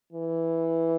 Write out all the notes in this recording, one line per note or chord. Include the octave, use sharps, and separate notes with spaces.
E3